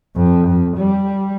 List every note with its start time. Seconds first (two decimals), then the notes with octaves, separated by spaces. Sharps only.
0.16 F2
0.48 F2
0.77 G3